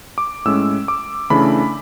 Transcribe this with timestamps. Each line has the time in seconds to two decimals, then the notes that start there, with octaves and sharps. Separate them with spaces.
0.18 D6
0.45 A2 G#3 C#4 E6
0.88 D6
1.30 C#3 E3 A3 D4 B5